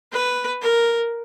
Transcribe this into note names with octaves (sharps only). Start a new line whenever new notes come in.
B4
A#4